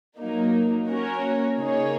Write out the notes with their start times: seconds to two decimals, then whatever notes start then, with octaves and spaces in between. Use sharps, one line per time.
0.18 F#3 A#3 D#4
0.89 A#3 C#4 F#4 A#4 C#5
1.58 C#3 A#3 D#4 G#4 C#5